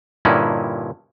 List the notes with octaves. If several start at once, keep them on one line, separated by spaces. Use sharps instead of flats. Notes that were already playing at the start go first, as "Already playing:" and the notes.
G2 A#2 D3 C#4 D#4 E4